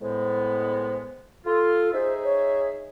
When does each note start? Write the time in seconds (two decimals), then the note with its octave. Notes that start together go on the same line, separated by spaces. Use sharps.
0.01 A2 G#3 B3 C5
1.46 F4 A4
1.93 D#4 G#4 C5 E5
2.24 C#5